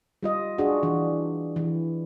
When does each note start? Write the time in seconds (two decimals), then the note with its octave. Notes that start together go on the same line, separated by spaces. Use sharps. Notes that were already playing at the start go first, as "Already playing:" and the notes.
0.23 G3 F4 D#5
0.58 D4 F4 F#4 G#4
0.83 E3 D4
1.56 E3